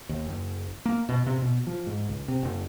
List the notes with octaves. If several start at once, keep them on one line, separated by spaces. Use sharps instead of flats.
D#2
F#1
A#3
B2
C3
B2
F3
G#2
C#2
C3
F#1